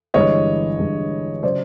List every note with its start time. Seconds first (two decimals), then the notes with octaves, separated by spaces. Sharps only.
0.14 G1 G2 E3 G#3 C#5 D#5
0.79 G1 G2 E3 G#3
1.43 C#3 F#3 C5 D5